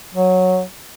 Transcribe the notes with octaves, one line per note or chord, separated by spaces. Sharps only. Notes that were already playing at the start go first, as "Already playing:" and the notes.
F#3